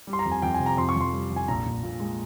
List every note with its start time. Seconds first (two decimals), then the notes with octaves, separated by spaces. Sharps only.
0.07 G3
0.13 C6
0.19 A#5
0.25 F2
0.32 G#5
0.42 F2 G5
0.54 G#5
0.60 C3
0.66 A#5
0.77 F2 C6
0.89 C#6
0.96 F2 C6
1.13 G3
1.30 F2
1.36 G#5
1.48 A#1 A#5
1.66 A#1
1.83 A#2
2.00 G#3